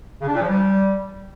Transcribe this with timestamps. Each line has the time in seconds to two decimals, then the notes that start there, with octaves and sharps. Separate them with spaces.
0.21 C#3
0.28 D4
0.35 A#2
0.42 F3
0.49 G3